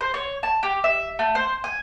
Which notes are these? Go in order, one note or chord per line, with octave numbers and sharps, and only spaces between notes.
C5
C#5
A5
G4
E5
A3
C5
G#5